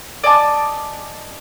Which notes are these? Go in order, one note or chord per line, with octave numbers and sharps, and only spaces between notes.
D5 D#5 G#5 A5